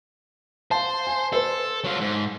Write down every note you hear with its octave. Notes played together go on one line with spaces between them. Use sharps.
C5 F5 A5
G#5
A4 B4 C5
F#3 F4
G#2